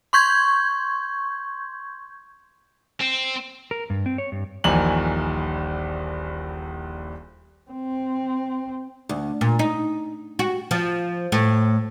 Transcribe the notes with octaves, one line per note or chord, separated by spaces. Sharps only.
C6 C#6 G6 G#6
C4
A#4
G2
C4
C#5
G2
D#1 A#1 D#3 E3 G#5 F#7
C4
D2
A#2
D#4
F#4
F3
A2